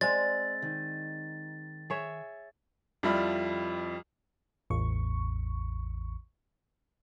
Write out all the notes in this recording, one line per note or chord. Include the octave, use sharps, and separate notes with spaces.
G#3 C4 D5 A6
D#3
G#4 C#5 E5
F2 F3 G3 E4 B5 F6
A1 E2 C#6